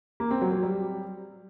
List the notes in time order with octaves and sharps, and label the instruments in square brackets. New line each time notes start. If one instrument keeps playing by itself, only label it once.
[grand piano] A#3
C4
F#3
F#3
G3